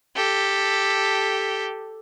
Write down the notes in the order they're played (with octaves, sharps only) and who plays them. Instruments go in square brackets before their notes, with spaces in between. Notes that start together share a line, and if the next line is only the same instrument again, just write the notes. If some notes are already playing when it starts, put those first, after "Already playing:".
[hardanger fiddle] G4 A4